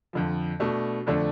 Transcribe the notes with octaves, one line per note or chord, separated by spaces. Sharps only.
F2 D3 F3
B2 A3 D4
F2 D3 A3 D4